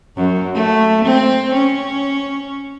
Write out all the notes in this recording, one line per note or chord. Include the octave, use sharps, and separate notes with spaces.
F#2
A3
C4
C#4